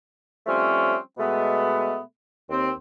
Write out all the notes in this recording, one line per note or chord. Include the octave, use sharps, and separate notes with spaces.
F3 G3 A3 C4 C#4
B2 G#3 A3 B3
D#2 C4